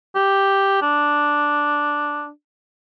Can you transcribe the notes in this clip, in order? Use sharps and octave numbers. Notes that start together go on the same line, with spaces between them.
G4
D4